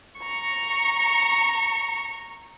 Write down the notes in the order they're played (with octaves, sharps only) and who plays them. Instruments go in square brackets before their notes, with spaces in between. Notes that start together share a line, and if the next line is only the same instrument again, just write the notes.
[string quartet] A#5 C#6